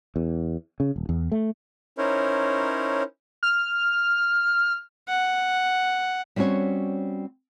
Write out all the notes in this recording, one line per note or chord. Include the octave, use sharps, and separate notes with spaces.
E2
C#3
D#1
E2
A3
C#4 D#4 E4 A#4 C5 C#5
F6
F#5
G3 C4 C#4 F#4 C#5